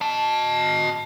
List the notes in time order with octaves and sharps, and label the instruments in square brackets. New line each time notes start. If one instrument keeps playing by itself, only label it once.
[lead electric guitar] D#5 A5